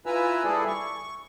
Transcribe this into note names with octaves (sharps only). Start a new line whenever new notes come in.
E4 F4 B4 G#5 A#5 E6
G3 E4 G#4 A4 D5
C#6